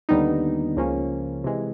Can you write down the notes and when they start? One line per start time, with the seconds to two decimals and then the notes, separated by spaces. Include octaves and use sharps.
0.09 D#2 D3 G3 B3 D#4
0.76 C#2 C#3 F3 A#3 C#4
1.44 C3 E3 G#3